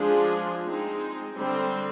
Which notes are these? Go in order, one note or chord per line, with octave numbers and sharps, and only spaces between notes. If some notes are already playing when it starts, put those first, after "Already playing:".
Already playing: F3 G#3 D4 F4 G#4
G#3 C4 D#4
D3 G3 C4